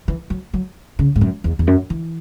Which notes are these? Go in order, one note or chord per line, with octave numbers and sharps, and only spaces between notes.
E3
F#3
F#3
C#3
G#2
F#2
E2
E2
F#2
E3